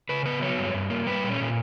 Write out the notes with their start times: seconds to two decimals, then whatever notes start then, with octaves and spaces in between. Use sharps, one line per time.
0.09 C#3 B4
0.26 B3 B4
0.42 F#3 C#5
0.58 G2
0.74 G2
0.90 A#3
1.07 G3 B4
1.24 A#2
1.29 C#4
1.40 A#2